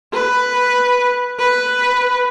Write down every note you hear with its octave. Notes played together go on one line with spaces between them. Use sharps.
B4
B4